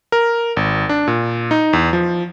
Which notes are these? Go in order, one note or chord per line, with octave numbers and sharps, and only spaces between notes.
A#4
G#1
D4
A#2
D#4
E2
F3